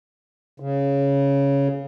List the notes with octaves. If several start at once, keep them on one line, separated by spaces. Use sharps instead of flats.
C#3